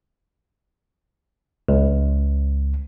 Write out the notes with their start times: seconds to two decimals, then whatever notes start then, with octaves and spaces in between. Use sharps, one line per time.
1.69 C#2